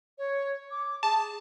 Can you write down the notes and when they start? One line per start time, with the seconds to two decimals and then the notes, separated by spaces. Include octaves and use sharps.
0.18 C#5
0.71 D6
1.03 G#4 A5